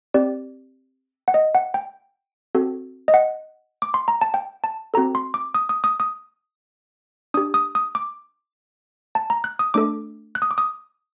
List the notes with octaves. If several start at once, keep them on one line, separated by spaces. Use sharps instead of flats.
C4 G4 D5
F#5
D#5
F#5
G5
C4 F#4 A4
D#5
F#5
D6
C6
A#5
A5
G5
A5
C4 F#4 A4 A#5
C6
D6
D#6
D#6
D#6
D#6
D4 G4 D#6
D#6
D#6
D6
A5
A#5
F#6
D#6
A3 D4 A4 D6
F#6
D#6
D6
D#6